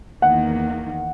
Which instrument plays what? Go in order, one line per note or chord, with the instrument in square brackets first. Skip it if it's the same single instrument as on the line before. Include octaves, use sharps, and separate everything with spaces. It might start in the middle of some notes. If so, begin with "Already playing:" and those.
[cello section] E2 D#3 A#3 [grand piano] F#5